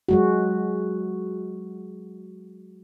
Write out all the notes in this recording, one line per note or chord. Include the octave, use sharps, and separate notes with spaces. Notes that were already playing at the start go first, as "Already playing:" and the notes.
F#3 G#3 F#4